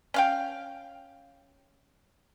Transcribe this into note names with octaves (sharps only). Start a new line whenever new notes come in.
C#4 F5 G5